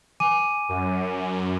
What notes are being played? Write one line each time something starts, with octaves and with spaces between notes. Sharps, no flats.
G#5 D6 D#7
F#2